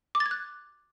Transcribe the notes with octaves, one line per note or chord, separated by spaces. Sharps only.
D6
A6
G#6
F#6